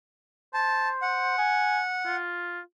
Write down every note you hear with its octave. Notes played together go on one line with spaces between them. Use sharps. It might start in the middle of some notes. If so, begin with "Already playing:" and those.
C5 A5
F#5
G#5
F4